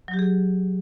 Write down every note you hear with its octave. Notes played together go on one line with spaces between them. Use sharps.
F#3
G4
G#4